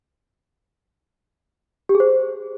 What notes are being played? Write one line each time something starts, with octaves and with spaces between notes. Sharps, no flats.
G4
G#4
C5